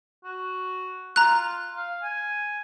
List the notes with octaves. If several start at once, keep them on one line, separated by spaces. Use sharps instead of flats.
F#4
F4 A#5 F#6
F5
G#5